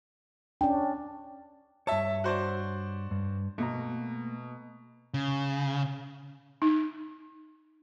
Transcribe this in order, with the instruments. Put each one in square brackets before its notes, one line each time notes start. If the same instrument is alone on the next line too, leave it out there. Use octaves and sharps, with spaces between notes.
[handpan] C#4 D4 [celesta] G5
[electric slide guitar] G2 C#5 [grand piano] E5 A5
[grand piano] F#4 C5 D5
[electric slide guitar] G2
[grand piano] B2 [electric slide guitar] A3 A#3 A#5
[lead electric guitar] C#3
[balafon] D#4